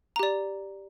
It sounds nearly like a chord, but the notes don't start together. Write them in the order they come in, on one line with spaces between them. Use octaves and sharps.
A#5 G4 D5